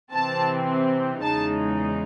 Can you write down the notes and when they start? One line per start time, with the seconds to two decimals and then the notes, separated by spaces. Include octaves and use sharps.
0.12 C3 E3 C4 A5
1.21 E2 C#3 G#3 D#4 A5